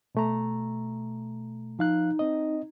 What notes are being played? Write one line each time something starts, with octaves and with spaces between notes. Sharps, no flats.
B2 A3 A#5
F3 D#4 F5 F#6
C4 D#5